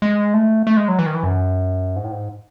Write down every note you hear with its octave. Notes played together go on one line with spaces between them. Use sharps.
G#3
A3
A3
G#3
F#3
E3
D#3
E3
F#2
G#2
A2
G#2